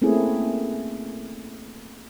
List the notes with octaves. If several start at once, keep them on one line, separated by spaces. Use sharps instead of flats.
A3 A#3 C4 C#4 E4 G#4